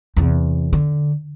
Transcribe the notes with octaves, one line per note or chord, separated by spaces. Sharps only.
E2 C3
D3